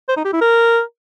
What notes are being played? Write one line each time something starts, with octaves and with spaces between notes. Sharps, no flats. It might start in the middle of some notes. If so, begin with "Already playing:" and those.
C5
D#4
G4
E4
A#4